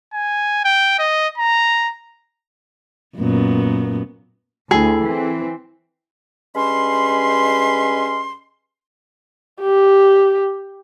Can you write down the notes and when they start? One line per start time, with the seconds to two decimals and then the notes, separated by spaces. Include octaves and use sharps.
0.13 G#5
0.65 G5
0.99 D#5
1.38 A#5
3.17 F#2 A#2 B3
4.71 D2 E4 G#4 A4 G5
5.05 E3 C4
6.55 G2 G#3 C#4 B5 C6
9.61 G4